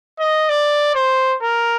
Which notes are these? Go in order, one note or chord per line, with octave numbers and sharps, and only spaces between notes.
D#5
D5
C5
A#4